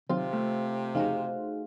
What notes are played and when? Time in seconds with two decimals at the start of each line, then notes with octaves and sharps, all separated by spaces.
0.09 C3 D#3 F#3 C4 F4 C5
0.32 A3 F4
0.95 F2 C#3 D#4 F#4 G#4 C5 F5